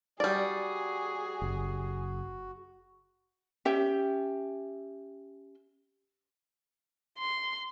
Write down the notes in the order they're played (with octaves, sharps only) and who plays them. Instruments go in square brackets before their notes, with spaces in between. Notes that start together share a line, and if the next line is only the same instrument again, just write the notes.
[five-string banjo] G3 D5 [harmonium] F#4 [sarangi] G#4
[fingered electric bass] F#1
[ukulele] C#4 G4 E5 G5
[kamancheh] C6